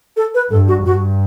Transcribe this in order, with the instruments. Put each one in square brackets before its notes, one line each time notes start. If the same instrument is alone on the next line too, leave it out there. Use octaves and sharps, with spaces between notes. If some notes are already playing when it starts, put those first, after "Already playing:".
[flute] A4
B4
[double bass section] G2 [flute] A4
[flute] F#4
[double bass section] G2 [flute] F#4